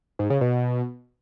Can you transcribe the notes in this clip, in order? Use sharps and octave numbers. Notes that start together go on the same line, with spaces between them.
G#2
C#3
B2